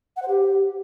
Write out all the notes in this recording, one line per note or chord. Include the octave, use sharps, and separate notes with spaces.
F#5
C5
G4